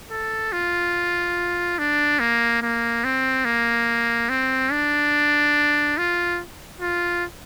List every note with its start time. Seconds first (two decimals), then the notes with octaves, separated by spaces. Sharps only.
0.11 A4
0.53 F4
1.79 D4
2.20 A#3
2.62 A#3
3.04 C4
3.45 A#3
4.30 C4
4.72 D4
5.98 F4
6.81 F4